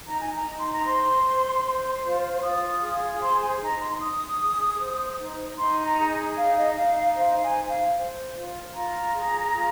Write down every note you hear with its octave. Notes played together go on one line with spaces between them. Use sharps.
D#4 A#5
G#5
A#5
D#4
C6
A#5
C5 C6
C5
C5
F4
F4 D#6
G#4
C5 C6
G#5
D#4 A#5
C6
D#4 D#6
G#4
C5
D#4
D#4 C6
A#5
G#4
D#4 F5
D#5
D#4 F5
F5
C5 F5
G#5
C5
F5
C5
F4
F4 A#5
G#4
F4